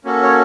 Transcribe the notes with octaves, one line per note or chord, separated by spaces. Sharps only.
A#3 C#4 F#4 A4
C#5